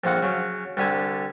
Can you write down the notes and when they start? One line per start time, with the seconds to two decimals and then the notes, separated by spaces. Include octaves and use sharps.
0.04 A#1 F2 A#3 F#5
0.23 C#3 F#3
0.77 C2 D3 G4 G#5 A5